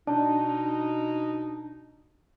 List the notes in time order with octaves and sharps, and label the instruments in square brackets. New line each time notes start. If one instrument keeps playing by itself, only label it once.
[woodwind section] B2 D#4 [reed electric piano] D4 [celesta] A5